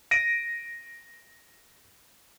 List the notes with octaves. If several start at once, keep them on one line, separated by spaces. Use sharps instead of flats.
A#6 D7 D#7